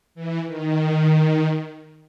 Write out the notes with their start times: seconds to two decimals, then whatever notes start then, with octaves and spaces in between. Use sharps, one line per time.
0.15 E3
0.46 D#3